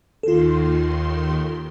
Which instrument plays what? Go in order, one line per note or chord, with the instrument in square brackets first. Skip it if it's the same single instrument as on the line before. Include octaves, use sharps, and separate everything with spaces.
[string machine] D#2 D#3 C6 [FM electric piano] F4 A4